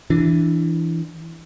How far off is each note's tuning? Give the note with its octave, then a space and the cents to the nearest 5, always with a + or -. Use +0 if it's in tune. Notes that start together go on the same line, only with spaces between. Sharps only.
E3 +0 D4 +0